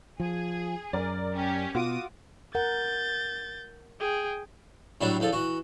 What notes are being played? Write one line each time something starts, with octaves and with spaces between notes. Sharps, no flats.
F3 G#4
F#2 A#4 D5
C#4 G4
B2 F4 F#4 D6 D#6
A#4 F#5 G6 A6
G#4 G5
A2 F#3 G3 D4 E4
E2 F3 A4
E3 F#4